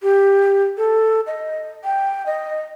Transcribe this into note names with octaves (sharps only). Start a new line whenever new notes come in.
G4
A4
D#5
G5
D#5